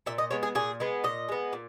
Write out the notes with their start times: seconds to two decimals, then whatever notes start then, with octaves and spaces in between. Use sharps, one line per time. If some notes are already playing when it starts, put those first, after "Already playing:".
0.06 A#2 E5
0.18 D#5
0.31 G#3 B3 C#5
0.43 G#4
0.55 A#2 G#4
0.80 G#3 B3
1.04 A#2 D#5
1.29 G#3 B3
1.53 A#2